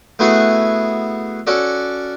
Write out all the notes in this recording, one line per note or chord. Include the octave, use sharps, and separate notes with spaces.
A3 B3 E4 F#4 G#4
C#4 F#4 A4 D5